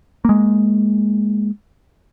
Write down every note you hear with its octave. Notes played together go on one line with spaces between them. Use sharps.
G#3 A#3